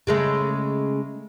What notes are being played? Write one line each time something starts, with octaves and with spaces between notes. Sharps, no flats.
C#3 G#3 A3